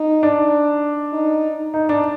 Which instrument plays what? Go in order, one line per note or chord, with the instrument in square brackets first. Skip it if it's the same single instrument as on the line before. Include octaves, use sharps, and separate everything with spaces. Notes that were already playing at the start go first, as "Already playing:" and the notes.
Already playing: [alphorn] D#4
[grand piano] D4
[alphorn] D#4
[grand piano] D#4
D4